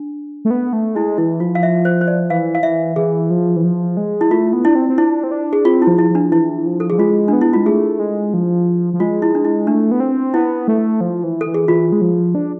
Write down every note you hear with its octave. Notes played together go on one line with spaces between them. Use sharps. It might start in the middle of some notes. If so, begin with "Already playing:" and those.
Already playing: D4
A3
B3
A3
G#3 E4
E3 E4
F3 F4
F5
E5
C5
C5
D5
E3 F5
F5
E3 E5
E3 G#4
F3
E3
F3
G#3
E4
A3 F4
B3
D4 E4
C4
C4
D4 E4
C4
D4
G#4
C4 F4
E4
F3
E4
F3 D4
E3 E4
F3
A4
F3 G#4
G#3 F4
B3 D4
E4
G#3 F4
A3 G#4
G#3
F3
F3
G#3 F4
E4
D4
E4
A3 D4
B3
C4
B3 E4
A3
F3
E3
A4
E3
G#4
E3 F4
G#3
F3
D4